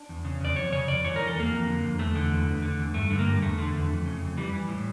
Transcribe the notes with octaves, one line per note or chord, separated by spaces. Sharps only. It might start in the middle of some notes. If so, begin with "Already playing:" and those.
Already playing: D4
E2
C#3
E2 D5
F2 C#5
C#3 C#5
F2 D5
E3 C#5
E3 A#4
A4
E2 A#3
F2
D3
F2
E2 A3
D3
E2
E2
D3
E2
G2 A3
D3
A#3
G2
E2 A3
D3
E2
F2
C#3
F2
E3 G3
E3
A2